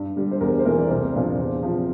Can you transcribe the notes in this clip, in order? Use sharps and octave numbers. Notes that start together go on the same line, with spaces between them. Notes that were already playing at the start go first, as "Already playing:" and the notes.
Already playing: G2
D3 G3
C5
E2 A#4
C5
E3 A3 C4 A#4
D5
C2 C5
A#2 F3 A#3 D4
E2
C3 F3